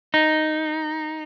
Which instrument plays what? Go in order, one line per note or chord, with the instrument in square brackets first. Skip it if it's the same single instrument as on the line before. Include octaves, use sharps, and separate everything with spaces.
[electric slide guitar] D#4